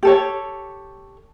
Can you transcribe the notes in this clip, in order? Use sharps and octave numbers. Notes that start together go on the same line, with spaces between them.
G4 A4 C#5